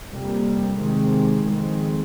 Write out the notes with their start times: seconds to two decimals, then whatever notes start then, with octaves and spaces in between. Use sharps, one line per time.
0.11 F2 C3 G3 A#3
0.79 C3 D#3 G#3 C4
1.46 F2 D#3 G#3 C4